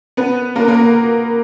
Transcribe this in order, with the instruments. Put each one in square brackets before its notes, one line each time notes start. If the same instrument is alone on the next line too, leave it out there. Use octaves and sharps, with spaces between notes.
[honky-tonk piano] B3 B4
A#3 A#4
A#3 A#4